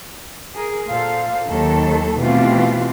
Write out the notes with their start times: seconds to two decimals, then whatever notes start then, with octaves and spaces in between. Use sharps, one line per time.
0.54 G#4 A#4
0.87 A#2 A4 C5 F5
1.49 D#2 D#3 F#3 A4
2.19 B2 E3 A3 C4 F4 G4